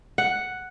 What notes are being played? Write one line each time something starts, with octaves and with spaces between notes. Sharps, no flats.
F#5